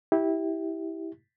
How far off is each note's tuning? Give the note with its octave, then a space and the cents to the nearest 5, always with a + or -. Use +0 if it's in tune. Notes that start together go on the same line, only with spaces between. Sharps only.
E4 -15 G4 +0